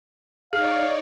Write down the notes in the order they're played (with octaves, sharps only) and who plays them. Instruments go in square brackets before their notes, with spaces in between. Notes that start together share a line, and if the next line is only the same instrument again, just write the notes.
[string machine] D#4 C#5 D5 [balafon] G#4 [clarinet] F5